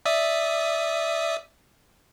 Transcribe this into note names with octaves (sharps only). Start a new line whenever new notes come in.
D5 E5 D#6